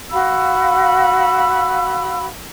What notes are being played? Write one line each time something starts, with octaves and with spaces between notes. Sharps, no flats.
F#4 F5 B5 E6